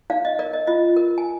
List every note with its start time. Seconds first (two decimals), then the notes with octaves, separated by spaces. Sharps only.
0.10 D#4 D5 F5
0.25 D#5
0.39 A#4 D5
0.53 D#5
0.67 F4 D#5
0.97 A#4
1.18 G#5